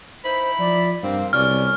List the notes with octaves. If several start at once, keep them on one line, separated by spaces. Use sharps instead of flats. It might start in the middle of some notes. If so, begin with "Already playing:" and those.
D#4 E4 C5 B5
F3 D5
G2 C3 A#3 C4 F5
C2 B2 C#4 D5 F6